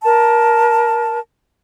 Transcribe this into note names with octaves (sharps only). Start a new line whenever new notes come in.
A#4 A5